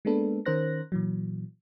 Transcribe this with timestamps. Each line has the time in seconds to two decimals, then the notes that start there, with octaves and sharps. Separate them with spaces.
0.05 G#3 A#3 B3 D4 A4 B4
0.46 D#3 C#4 A#4 C5 F#6 A#6
0.92 A#2 E3 F#3